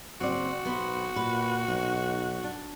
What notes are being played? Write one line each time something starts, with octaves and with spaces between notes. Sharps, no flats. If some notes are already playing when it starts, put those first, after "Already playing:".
F#1 C4 F#4 C5 D5
B1 B3 B4 C5
A#2 B4
B1 D#4
D4